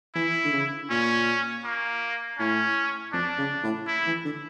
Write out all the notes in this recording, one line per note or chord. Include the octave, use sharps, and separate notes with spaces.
E3 E4
D3
C#3
A#2 C#4
A#3
A2 C#4
F2 D4
C#3
A2
E4
E3
D3